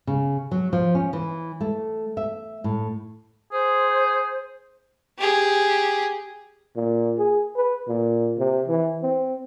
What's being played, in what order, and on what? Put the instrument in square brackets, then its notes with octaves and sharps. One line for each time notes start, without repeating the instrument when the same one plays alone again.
[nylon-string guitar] C#3
F#3
F3
C#4
E3
A3
E5
A2
[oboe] G#4 [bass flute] C5
[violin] G4 G#4
[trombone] A#2
G#4
B4
A#2
C3
E3
C4